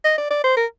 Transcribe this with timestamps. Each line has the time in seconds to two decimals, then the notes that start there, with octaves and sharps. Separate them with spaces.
0.05 D#5
0.18 D5
0.31 D5
0.44 C5
0.57 A#4